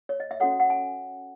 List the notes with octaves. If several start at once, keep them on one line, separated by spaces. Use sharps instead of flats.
C#5
D#5
E5
C#4 F#4 A4 C#5 F#5
F#5
G#5